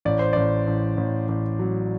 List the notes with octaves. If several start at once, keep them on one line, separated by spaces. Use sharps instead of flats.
A1 D5
C5
A1 D5
A1
A1
A1
F#3